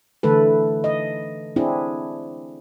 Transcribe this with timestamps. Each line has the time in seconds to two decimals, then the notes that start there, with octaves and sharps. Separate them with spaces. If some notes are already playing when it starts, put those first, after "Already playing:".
0.23 D3 E3 A3 A4 B4
0.84 D#5
1.56 C4 D4 E4 G#4